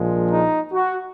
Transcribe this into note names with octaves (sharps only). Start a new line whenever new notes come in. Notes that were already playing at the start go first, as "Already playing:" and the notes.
Already playing: A#1 A#2 F3 G#3
D#4
F#4